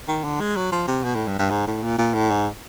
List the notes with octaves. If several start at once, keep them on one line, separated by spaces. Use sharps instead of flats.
D#3
D3
G#3
F#3
F3
C3
B2
A2
G2
G2
G#2
A2
A#2
A#2
A2
G#2